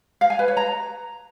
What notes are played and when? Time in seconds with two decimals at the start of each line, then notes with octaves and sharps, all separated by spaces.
0.21 F5
0.30 G#5
0.39 B4
0.48 C#5
0.57 A#5